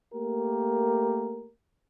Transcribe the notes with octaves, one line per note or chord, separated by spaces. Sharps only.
A3 A#3 G4 A#4